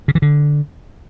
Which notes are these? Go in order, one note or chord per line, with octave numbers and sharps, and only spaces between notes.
C#3
E3
D3